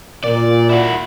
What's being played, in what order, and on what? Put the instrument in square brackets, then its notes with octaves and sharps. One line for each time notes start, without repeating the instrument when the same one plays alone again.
[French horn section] A#2 [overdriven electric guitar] D5
[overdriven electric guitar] E4 F#4